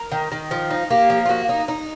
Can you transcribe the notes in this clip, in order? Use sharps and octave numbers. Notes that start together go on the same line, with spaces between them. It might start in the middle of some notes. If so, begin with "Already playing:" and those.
Already playing: A#4
D#3
D#3
F3
D#4
A#3 G4
F3
F4
A#3 F#4
D#4
D#4